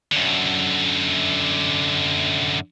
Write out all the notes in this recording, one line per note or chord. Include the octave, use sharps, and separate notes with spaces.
F#2 D3